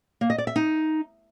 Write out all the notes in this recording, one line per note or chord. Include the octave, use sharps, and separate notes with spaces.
A#3
D#5
D5
E5
D#4